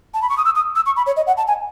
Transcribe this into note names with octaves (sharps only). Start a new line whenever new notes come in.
A5
B5
C#6
D#6
E6
D#6
E6
C#6
B5
C#5
D#5
F#5
A5
G#5